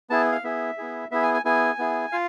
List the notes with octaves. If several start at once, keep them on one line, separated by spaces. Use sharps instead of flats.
B3 E4 G#4 A5
F5
B3 E4 G#4 E5
B3 E4 G#4
B3 E4 G#4 E5
G#5
G#5
B3 E4 G#4 G#5
B3 E4 G#4
F4 F5